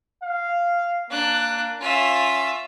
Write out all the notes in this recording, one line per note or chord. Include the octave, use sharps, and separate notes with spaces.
F5
A#3 D4 F#6
C#4 F4 E5